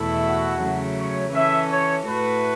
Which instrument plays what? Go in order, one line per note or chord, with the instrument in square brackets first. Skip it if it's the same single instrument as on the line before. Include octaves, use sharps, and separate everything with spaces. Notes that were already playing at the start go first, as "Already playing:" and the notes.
Already playing: [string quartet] E2 B2 A3 E4 A4
[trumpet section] F#4
[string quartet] C#3 F#3 A3
[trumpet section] C#5
[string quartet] E3 C#4 A4 [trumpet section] E5
[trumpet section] C#5
[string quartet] A2 A3 F#4 A4 [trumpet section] B4